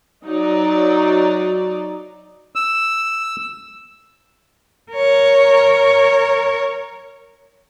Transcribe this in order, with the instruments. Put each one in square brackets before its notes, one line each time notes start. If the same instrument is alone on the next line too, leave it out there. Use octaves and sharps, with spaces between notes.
[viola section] F#3 D#4 D5
[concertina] E6
[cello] A#4 C#5